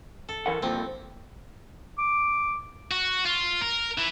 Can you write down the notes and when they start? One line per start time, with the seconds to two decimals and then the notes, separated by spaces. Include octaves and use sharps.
0.29 A4
0.46 E3 A#4 F#5
0.62 G2 A#2 F3 C4
1.98 D6
2.91 F#4
3.25 F4
3.61 A#4
3.98 E3